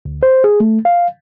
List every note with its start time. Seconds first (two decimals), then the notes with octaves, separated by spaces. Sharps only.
0.05 D2
0.23 C5
0.44 G#4
0.60 A3
0.85 F5